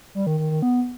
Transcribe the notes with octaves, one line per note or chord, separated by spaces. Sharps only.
G3
D#3
D#3
D#3
B3